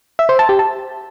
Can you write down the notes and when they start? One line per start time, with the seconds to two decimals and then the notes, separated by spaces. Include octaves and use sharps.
0.19 E5
0.29 C5
0.39 A5
0.49 G4
0.59 A5